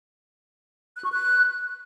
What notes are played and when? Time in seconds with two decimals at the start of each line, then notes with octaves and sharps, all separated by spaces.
0.97 F#6
1.04 C#6
1.11 F#6